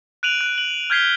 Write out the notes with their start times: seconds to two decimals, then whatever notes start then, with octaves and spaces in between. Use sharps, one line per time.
0.23 F#6 D7 D#7 F7 F#7
0.41 F#6
0.58 F#7
0.90 F6 G6 G#6 B6 C7 G7